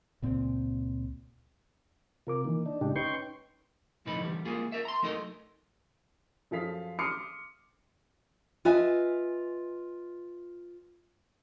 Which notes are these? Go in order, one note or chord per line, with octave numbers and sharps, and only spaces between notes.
C#2 A#2 C4
C3 F4 A#4 D6
D#3 E3 A#3
D4 D#4
A2 C#3 G#3 D4 D#4 G4
C#4 D#4 B4 G5 C6 C#6
B1 F2 A2 D3 D#4 B4
E2 G3
G#3 A#3 F4 G#4
A#4 E5
A#5 C6
F#3 A3 D#4 A#4 D#5
F#2 F3 G#4 A4 F5 B6
C6 D6 D#6 F6 C7 C#7
F4 B4 D#5 E5 G#5